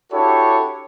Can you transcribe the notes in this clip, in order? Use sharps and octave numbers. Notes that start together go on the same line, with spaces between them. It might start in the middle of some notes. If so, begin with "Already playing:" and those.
D4 E4 F#4 G4 A4 C#5